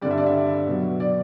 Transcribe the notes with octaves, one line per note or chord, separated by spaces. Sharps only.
G2 D3 G3 D5
E5
D5
E5
B2 F#3
D5